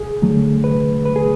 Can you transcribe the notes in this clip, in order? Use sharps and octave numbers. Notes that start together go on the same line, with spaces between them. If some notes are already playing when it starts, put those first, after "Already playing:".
Already playing: G#4
D3 F#3 A3
B4
B4
G#4